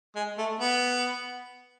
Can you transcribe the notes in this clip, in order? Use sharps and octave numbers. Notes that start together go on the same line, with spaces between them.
G#3
A3
B3